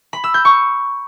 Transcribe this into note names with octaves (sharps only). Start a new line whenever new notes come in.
B5
E6
G6
C#6